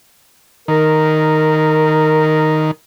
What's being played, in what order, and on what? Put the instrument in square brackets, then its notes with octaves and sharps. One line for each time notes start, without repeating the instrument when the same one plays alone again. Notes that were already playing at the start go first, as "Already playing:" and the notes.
[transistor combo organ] D#3 [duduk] A#4